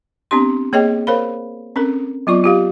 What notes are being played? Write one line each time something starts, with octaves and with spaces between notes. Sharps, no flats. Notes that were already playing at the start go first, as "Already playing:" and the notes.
B3 C4 D4 G4 C6
A#3 G#4 C#5 D#5 G5
A#4 C5 C#5 F5 B5
C4 C#4 A4 A#4
F#3 B3 F4 D5 C#6
F4 G4 F5